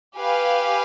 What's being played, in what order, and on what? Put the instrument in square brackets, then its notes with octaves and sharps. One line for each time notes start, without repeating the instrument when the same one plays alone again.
[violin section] G4 B4 F5 G#5